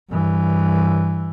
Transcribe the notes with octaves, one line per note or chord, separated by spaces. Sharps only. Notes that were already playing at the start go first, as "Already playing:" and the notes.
G2 E3